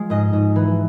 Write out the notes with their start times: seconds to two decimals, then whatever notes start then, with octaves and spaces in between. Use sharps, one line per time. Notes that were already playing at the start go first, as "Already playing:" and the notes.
Already playing: F3 G#3
0.10 G#2 D#5
0.33 G#2
0.56 E3